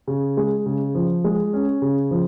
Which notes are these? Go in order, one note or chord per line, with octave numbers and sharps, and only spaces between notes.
C#3
G#3
C#3
F3
G#3
C#4
C#3
F3